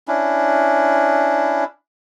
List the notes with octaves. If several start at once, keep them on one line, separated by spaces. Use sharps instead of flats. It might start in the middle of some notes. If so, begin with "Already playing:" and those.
C#4 D4 E4